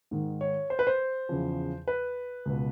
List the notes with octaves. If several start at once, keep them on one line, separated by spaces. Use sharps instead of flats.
G#2 D#3
C#5
C5
B4
C5
E2 C#3 F3
B4
C#2 B2